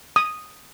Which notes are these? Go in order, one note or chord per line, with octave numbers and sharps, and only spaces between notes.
D#6